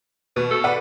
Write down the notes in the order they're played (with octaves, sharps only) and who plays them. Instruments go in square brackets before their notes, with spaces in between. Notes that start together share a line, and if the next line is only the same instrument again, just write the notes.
[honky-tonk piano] B2 [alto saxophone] B4
[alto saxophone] A4
[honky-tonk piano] B4 D5 F#5